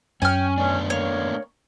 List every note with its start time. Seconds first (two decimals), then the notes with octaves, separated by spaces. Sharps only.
0.22 F#2 C#4 G5 G#5 F6
0.58 A3 B3 C#4 D4
0.90 A#3 C#5